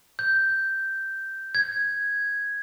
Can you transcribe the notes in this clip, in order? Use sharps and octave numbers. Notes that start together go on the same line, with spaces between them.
G6
G#6